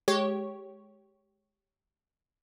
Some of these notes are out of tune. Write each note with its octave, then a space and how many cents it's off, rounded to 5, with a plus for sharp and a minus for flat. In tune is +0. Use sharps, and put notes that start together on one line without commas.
G#3 +15 G4 -10 C#5 +0